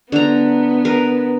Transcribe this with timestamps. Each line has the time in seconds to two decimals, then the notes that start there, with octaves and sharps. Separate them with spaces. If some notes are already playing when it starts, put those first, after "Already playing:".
0.12 D3 B3 A#5
0.85 A#4 B4